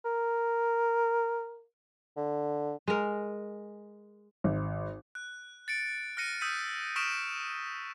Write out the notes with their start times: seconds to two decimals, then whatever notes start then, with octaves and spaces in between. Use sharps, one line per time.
0.05 A#4
2.17 D3
2.88 G#3 A#4
4.44 G#1
5.15 F#6
5.68 A6 C#7 D7
6.17 F6 F#6 A#6 C#7 D#7
6.41 D#6 E6 G6 B6 D#7
6.96 C#6 D#6 F6 B6 D7 E7